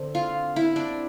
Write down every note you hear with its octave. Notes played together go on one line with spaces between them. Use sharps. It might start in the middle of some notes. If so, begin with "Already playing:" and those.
Already playing: D3 C4
F4
E4
D4